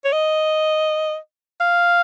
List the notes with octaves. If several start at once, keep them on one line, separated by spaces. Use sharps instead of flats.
C#5
D#5
F5